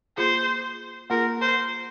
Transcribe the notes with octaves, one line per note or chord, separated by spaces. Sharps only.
A#3 F4 G#4 C5
A#3 F4 G#4 A#4
C5